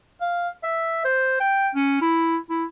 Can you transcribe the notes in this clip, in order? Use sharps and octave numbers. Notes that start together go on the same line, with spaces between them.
F5
E5
C5
G5
C#4
E4
E4